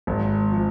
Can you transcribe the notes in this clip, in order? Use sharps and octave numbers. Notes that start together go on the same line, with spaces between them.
G#1
F3